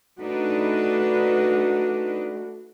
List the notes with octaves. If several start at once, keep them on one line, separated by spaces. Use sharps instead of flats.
A3 D4 D#4 F#4 B4